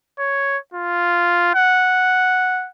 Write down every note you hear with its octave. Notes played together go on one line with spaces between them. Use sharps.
C#5
F4
F#5